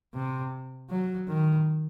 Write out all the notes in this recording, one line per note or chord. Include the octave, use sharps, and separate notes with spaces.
C3
F#3
D#3